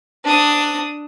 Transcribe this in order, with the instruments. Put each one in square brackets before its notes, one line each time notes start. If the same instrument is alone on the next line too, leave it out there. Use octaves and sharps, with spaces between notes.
[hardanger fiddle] D4 D#6